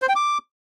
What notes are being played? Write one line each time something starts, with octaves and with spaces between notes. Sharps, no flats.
C5
G5
D6